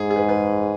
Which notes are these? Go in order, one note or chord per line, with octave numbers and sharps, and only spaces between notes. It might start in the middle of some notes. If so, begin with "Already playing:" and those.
Already playing: G#2 G#4
G#4
B4
B4